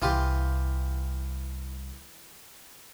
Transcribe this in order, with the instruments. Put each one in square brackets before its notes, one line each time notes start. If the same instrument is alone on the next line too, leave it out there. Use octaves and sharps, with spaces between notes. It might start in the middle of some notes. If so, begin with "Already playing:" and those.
[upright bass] C2 [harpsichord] E3 F4 G4